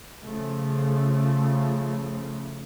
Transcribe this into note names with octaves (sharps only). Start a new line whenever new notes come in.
C#3 F3 A3